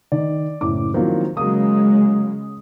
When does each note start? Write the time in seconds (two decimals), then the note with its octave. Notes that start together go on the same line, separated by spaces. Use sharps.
0.12 D#3 D5
0.61 F#1 A2 D6
0.94 D#3 F3 F#3 A#3 C4 E4
1.37 C#3 F#3 G#3 A#3 D#6